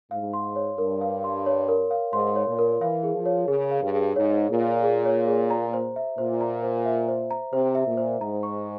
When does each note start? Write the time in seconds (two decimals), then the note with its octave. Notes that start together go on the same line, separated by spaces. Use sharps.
0.11 G#2 F5
0.33 C6
0.56 C#5
0.78 G2 A#4
1.01 F5
1.24 C6
1.46 C#5
1.69 A#4
1.91 F5
2.13 G#2 C6
2.36 C#5
2.47 A#2
2.59 A#4
2.81 E3 F5
3.03 G#4
3.15 F3
3.26 C#5
3.48 C#3 G#4
3.71 F5
3.82 G2
3.94 G#4
4.16 G#2 C#5
4.38 G#4
4.50 A#2
4.61 F5
4.83 G#4
5.06 C#5
5.28 G#4
5.50 A#5
5.74 C5
5.96 E5
6.18 A#2 C5
6.41 A#5
6.63 C5
6.85 E5
7.08 C5
7.31 A#5
7.53 C3 C5
7.75 E5
7.87 A#2
7.97 C5
8.21 G#2 A#5
8.43 C#6